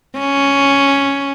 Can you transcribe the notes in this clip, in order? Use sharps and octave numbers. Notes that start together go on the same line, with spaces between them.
C#4